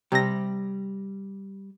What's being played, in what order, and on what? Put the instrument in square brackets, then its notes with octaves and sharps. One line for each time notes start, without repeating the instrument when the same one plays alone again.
[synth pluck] C3 A#6 [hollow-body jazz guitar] G3